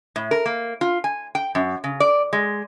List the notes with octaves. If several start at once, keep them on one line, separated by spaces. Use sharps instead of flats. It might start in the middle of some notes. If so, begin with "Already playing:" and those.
A2
A#4
A#3
F4
G#5
G5
F#2
C#3
D5
G#3